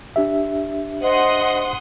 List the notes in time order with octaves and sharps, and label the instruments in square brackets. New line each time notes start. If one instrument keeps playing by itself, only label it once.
[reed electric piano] D4 G4 E5
[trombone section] C5 [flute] D#5 [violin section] F#5 C6 D#6